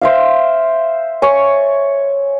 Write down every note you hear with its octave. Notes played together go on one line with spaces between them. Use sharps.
C5 E5 F5
C#5 G#5 C#6